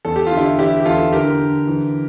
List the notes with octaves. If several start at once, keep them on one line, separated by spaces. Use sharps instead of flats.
E2 A4
G4
D3 F4
E4 G4
E3 E4 G4
G4
E2 F4 A4
D3 G4 A#4
D3
E3